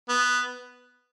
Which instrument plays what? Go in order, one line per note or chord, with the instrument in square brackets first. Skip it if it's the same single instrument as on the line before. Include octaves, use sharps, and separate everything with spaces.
[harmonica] B3